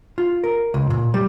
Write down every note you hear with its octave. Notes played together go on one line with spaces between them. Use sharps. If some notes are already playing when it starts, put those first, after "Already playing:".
F4
A#4
C#2
A#2
G3